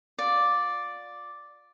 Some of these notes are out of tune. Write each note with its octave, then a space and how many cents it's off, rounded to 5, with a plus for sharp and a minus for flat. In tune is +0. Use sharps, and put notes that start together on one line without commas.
F4 +25 D5 +0